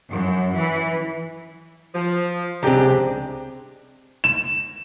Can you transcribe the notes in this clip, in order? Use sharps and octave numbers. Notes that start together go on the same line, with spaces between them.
F#2
E3
F3
C#2 C3 C4 D4 G4 G#4 A#5
E7